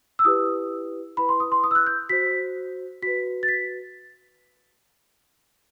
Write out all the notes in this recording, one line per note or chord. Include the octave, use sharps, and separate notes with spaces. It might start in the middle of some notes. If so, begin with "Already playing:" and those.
E6
E4 G4 B4 D#6
E4 B4 B5
C6
D#6
C6
D#6
E6
F#6
G6
F#4 C5 B6
F#4 B4 B6
A6
B6